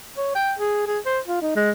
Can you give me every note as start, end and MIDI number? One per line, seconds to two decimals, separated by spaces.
0.17 0.31 73
0.35 0.54 79
0.59 0.83 68
0.87 0.99 68
1.06 1.19 72
1.28 1.40 65
1.42 1.53 63
1.56 1.71 56